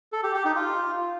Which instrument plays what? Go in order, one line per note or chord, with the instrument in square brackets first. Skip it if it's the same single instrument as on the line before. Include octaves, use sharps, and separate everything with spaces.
[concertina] A4
G4
G4
D#4
F4